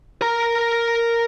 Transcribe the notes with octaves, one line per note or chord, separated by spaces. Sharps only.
A#4 A#5